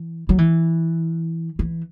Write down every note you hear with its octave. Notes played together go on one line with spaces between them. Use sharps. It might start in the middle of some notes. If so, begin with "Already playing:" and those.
Already playing: E3
F#3
E3
E3